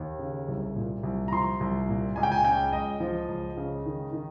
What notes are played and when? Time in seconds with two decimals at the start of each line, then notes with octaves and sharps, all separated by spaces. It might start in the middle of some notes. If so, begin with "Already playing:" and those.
Already playing: D#2
0.19 C#3
0.48 C2
0.76 A#2
1.03 C2
1.28 A#5
1.32 F3 C6
1.60 C2
1.89 A#2
2.16 C#2 G#5
2.23 G5
2.32 G#5
2.45 C#3 G5
2.72 C#2 D#5
3.00 F3
3.28 C#2
3.57 C#3
3.86 D#3
4.13 D#3